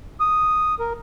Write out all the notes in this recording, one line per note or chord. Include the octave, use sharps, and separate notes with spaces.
D#6
A#4